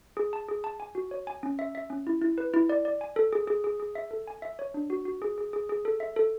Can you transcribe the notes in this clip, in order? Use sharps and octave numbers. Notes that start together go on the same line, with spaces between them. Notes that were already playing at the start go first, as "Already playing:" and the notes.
G#4
A5
G#4
A5
G#5
F#4
C#5
G#5
C#4
E5
E5
C#4
E4
E4
B4
E4
D5
D5
G#5
A4
G#4
G#4
G#4
G#4
E5
A4
G#5
E5
C#5
D4
F#4
F#4
G#4
G#4
G#4
G#4
A4
E5
A4